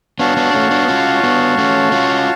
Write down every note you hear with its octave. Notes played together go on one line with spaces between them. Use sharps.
B3 D4 F#4 C#5 F5 A5
B3 D4
A3 C#4
B3 D4
C#4 F4
B3 D4
A3 C#4
C#4 F4